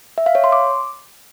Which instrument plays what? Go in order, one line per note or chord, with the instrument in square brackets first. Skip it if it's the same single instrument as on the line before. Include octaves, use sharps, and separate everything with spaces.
[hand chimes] E5
F5
C#5
C6
D6